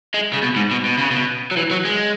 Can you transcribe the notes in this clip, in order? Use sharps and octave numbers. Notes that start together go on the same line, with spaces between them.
G#3
C#3
B2
G#2
B2
B2
C#3
B2
F#3
E3
F#3
G#3